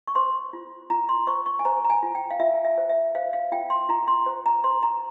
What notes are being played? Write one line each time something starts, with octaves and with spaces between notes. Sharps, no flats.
C#6
C5 C6
F4
F4 A#5
C6
C5 C#6
C#6
G#5
C5 A#5
A#5
G#5
F4
G5
F5
F4 E5
E5
C5
E5
C5 F5
F5
F4 G5
C6
F4 A#5
C6
C5
A#5
C5 C6
A#5